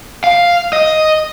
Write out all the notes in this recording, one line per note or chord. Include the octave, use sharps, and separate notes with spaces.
F5
D#5